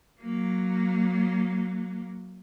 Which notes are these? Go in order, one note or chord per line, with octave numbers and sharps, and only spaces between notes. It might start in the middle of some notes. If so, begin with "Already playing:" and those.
F#3 A#3